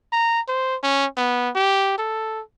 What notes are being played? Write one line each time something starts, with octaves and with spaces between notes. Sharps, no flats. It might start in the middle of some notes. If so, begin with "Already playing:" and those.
A#5
C5
C#4
B3
G4
A4